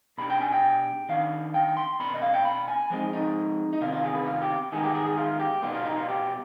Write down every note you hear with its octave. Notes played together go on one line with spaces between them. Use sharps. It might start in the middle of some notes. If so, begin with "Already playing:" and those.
B2 G3 D4 B5
G5
G#5
G5
D#3 B3 D4 F5
G5
C6
B2 B3 D4 B5
D#5
F5
G5
B5
G#5
F3 G#3 C4 D#4
D#4
D#4
C3 D#3 B3 D4 F4
F4
G#4
B4
F4
G4
D#3 G#3 B3 D#4 G#4
G4
G#4
G#4
F4
G4
B2 G3 B3 D#4 F4
F4
D#4
F4
G4